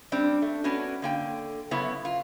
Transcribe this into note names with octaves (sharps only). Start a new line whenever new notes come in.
G3 C4 D4
A3
B3 C#4 D4 F#4
D3 A#3 G5
F#2 C#3 B3 E4 C#5
F4